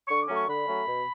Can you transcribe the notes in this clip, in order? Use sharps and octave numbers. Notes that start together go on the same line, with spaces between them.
D3 C#6
D6
F#3 A3 C#4
C#6
D3 B5
F#3 A3 C#4
B2